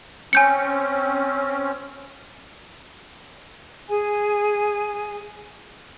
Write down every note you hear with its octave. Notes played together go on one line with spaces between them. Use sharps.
C4 C#4 G#5 G6 C#7
G#4 G#5